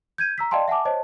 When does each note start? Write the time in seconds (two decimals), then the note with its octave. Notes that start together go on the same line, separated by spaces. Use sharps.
0.18 G6 G#6 D#7
0.38 A#5 E6 B6
0.51 D5 D#5 F5 G5 A5 C6
0.68 E5 F#5 G#5 A5 D6
0.85 C5 C#5 D#5 A5